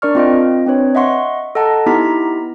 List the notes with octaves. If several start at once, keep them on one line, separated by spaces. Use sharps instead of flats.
D4 A#4 D5 C#6 F6
C4 F4 D#5 G5
C4 D4 B4 C#5
D#5 E5 F#5 C6 C#6
A4 D#5 F#5 A5 A#5
B3 D#4 E4 G4 A#5 B6